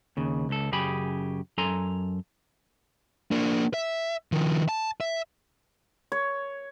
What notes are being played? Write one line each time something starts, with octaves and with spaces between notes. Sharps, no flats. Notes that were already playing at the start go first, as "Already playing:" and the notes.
D#2 C#3
C#2 A4
F#2 C#3 G4 G#4 B5
F#2 A4 G#5 A#5 C6
A#3 D4
E5
D#3 F3
A5
E5
C#5